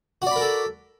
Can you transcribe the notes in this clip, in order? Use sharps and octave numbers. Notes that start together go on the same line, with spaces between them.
F#4 A4 A#4 D5 B5